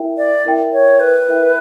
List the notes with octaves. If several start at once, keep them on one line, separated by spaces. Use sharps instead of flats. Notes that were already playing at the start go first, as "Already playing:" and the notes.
Already playing: E4 A#4 E5 G5
D5
E4 A#4 E5 G5
C#5
B4
E4 A#4 E5 G5